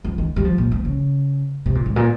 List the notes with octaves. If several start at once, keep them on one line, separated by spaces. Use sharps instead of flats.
F3
D#3
G3
F3
A#2
F3
C#3
C3
A#2
G#2
A#2